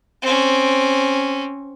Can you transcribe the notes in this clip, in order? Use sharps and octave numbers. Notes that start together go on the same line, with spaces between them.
C4 C#4